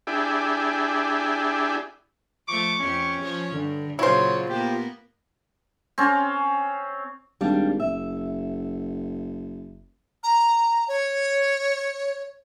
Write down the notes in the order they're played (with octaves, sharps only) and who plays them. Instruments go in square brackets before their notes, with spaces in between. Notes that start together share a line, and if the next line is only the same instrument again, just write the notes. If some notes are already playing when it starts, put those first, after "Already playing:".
[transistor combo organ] D4 E4 G4 G#4
[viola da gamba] F3 A3 [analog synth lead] C#6 [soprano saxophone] D6
[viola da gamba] F2 G4 [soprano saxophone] C#4
[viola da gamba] F3 C#5
[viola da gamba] G2 [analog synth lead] D3
[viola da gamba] A#2 C#3 F#3 [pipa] E4 C5 [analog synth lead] F4 [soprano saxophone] C#5
[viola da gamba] A#3 B3 [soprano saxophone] G4
[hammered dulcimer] C4 C#4
[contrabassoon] G#1 [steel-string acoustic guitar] G3 D4 F5
[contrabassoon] F#1 [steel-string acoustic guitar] E5
[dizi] A#5
C#5